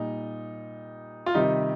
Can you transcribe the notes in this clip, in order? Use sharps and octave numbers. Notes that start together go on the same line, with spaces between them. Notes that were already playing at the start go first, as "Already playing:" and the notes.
Already playing: A#2 G3 D#4
F4
C3 D#3 G3 D#4